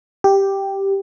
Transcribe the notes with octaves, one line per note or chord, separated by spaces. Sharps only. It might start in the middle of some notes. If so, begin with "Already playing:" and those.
G4